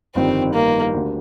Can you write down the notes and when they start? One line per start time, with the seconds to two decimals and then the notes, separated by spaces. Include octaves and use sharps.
0.15 G1 F2 D#3 G3 C4
0.54 A#3
0.94 D2 D3 G3